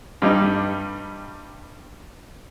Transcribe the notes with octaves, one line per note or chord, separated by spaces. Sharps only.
G2 G3 D#4